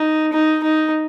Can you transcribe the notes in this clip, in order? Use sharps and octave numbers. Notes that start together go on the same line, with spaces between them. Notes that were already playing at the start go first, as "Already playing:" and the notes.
Already playing: D#4
D#4
D#4